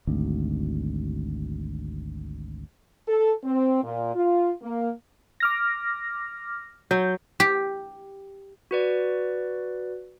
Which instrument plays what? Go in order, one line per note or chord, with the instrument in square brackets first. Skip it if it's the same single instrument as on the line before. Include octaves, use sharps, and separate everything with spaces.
[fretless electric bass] G#1 D2
[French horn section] A4
C4
A#2
F4
A#3
[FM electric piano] D6 F6 A#6
[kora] F#3 [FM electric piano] G6
[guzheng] G4
[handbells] F#4 B4 D5